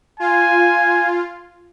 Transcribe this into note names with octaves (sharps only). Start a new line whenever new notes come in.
F4 G#5